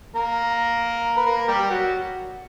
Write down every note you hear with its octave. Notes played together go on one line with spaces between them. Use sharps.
A#3 A#4
B4
A#3 A#4
G3 G4
F#3 F#4